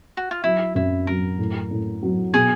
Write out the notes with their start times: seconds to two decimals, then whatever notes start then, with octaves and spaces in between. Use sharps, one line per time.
0.17 F#4
0.31 F4
0.44 F#3 E4
0.75 F#2 E4
1.07 F#3 A#4
1.39 A2
1.71 A2
2.03 F#3
2.34 B2 G#4